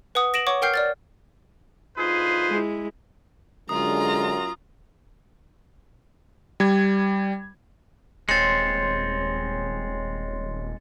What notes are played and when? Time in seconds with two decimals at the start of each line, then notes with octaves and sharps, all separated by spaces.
0.15 B4 F#5 D#6
0.34 A#6 D7 E7 F#7
0.47 C#5 F#5 C#6 D6
0.62 A#4 F#5 G5 F6 G6 C7
0.74 D5 F6 A6
1.98 D2 D#4 F4 G#4 B4 C5
2.49 G#3 E4
3.69 F#2 D3 G#3 F4 A#5 D#6
6.60 G3 G#6
8.29 D#1 G#3 C4 C#5 C6 A6 C#7